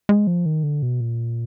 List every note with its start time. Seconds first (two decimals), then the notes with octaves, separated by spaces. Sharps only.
0.09 G#3
0.27 F3
0.46 D#3
0.63 D3
0.82 B2
1.01 A#2